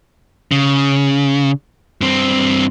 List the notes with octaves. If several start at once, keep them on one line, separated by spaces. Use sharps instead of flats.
C#3
G2 C4